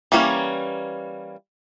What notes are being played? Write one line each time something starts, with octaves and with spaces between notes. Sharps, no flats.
E3 G3 A#3 B3 C#4